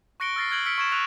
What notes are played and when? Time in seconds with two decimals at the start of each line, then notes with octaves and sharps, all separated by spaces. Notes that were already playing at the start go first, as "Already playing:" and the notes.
0.20 C#6 F#6 A#6 C#7 D7 G7
0.36 E6 F6 A6 A#6 C7
0.51 F6 F#6 G#6 D7 F#7 G7
0.66 E6 F6 B6 C#7 D7
0.78 C#6 G#6 E7
0.92 C#6 E6 F#6 A6 D#7 F7